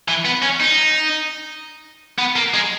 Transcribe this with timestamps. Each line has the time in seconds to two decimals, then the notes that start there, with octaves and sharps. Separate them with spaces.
0.08 E3
0.25 B3
0.42 C#4
0.60 D#4
2.19 B3
2.36 A#3
2.54 G#3